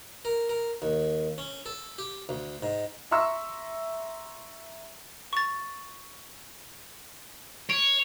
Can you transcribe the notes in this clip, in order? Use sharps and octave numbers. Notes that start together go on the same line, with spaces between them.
A#4
A#4
D#2
C#4
A4
G4
D2
G#2
E5 A#5 C6 C#6 E6
C#6 A6
C#5 D7